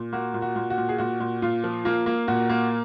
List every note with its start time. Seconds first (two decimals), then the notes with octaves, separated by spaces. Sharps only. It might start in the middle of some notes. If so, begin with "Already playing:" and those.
Already playing: A#2
0.13 A#3 F#4
0.34 A#2
0.42 F#4
0.56 A#2
0.70 F#4
0.78 A#2
0.89 G#4
0.98 A#2 F#4
1.20 A#2
1.42 A#2 F4
1.64 F3
1.85 A#3 F4
2.06 A#3
2.28 A#2 F#4
2.50 A#3